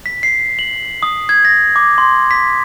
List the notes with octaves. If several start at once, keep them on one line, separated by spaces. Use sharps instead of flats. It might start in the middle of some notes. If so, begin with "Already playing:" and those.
B6
C7
F#7
D#6
G#6
A#6
D6
C6
B6